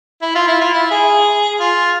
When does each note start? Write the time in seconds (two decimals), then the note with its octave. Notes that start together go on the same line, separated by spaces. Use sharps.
0.22 E4
0.35 F4
0.47 E4
0.61 F4
0.73 E4
0.91 G#4
1.60 F4